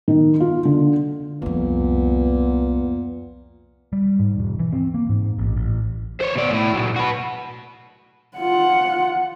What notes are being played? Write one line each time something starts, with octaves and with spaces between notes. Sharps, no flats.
D#3
F4
D3
C2 F2 A#2 B3
G3
G#2
E1
E3
C4
A#3
G#2
A1
A1
C5 C#5
B2 D5
A2 E4
A#2 F#3
F#4 B4
F4 F#5